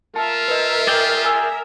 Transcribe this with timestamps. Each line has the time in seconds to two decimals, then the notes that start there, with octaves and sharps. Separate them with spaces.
0.16 F4 A#4 E5 A5
0.48 B4 D#5
0.87 G#4 D5 G5
1.25 G#5 E6